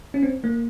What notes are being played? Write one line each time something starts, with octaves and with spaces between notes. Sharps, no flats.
C#4
C4
A#3